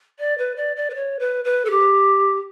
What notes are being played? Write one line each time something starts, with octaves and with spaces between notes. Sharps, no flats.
D5
B4
D5
D5
B4
C#5
B4
B4
A4
G4